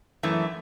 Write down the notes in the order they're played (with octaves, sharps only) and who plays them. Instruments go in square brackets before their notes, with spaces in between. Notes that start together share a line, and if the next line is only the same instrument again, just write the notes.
[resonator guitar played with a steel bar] F#2 E3 A3